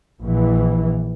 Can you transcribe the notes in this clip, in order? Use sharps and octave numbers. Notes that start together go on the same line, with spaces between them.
A#1 E3